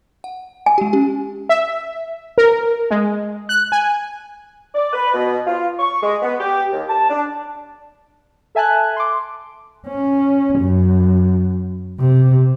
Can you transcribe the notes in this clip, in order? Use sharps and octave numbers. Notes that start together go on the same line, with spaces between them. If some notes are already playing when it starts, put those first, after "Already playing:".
F#5
G#5
G#3 G4
C#4 G4
E5
A#4
G#3
F#6
G#5
D5
B4
B2
F4
C#6
G#3
B3
G4
D#2
A5
D4
A4 E5 G#5 A5 F#6
C6 D6
C#4
F#2
C3